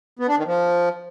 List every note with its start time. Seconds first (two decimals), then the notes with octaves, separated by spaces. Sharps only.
0.19 B3
0.28 D4
0.37 D#3
0.46 F3